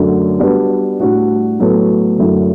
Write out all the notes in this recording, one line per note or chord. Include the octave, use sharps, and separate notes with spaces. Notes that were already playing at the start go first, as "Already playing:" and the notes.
Already playing: F#2 D3 F#3 A3
G3 B3 D4 F#4 B4
A2 G3 D4 F#4
A2 F#3 B3 F#4 A4
F#2 D3 F#3 A3 E4